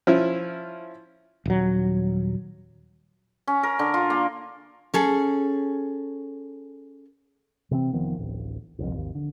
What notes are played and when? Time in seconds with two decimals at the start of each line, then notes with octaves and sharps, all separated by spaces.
0.07 F3 C#4 E4
1.46 D#1 F#3
3.48 C#4
3.63 A#4
3.79 D3
3.94 F4
4.10 A#3
4.94 C#4 G#4 A4
7.71 C3 E3 A#3 C4
7.93 F1 D#3 F3 B3
8.19 D1 A1
8.79 E1 C2 F2
8.93 G#1 D#2
9.15 D3